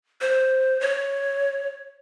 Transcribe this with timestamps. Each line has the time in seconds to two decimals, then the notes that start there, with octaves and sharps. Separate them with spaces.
0.21 C5
0.81 C#5